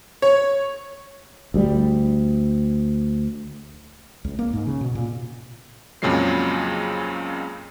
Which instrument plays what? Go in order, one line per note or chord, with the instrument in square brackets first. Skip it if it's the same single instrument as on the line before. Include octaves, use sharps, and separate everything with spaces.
[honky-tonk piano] C#5
[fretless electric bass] D2 G3
C#2
A#3
G#2
C#3
B2
A#2
[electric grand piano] F2 A#2 C#3 F#3 G#3 C7